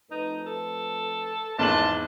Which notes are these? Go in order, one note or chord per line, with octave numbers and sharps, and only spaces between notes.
F2 A3 D#4 B4
A4
G#1 E2 C#3 F4 D5 A5 F#7